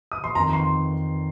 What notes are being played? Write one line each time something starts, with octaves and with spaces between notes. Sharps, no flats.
D#6
C6
F2 D#3 A#5
C6